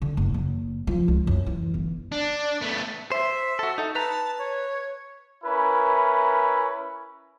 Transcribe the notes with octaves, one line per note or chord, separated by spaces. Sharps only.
D3
F#1
F#1
F3
C#2
F#2
E3
G1
D4
A3 B3
C5 E5
F#4 A4
D#4 A4
B4 A5 A#5
C#5
C#4 E4 A#4 B4